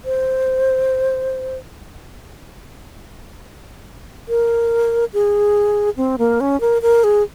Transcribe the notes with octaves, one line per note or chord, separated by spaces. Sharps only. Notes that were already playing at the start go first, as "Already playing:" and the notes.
C5
A#4
G#4
C4
A#3
C#4
A#4
A#4
G#4